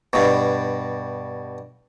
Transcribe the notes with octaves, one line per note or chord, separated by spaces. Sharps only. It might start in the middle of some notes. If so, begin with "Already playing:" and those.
G2 B2